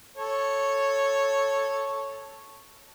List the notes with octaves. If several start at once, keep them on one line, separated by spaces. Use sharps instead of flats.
A4 C#5